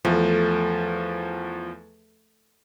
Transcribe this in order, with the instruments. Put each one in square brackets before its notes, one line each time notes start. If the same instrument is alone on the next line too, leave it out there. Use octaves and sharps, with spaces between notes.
[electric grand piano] E2 F3 [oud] A3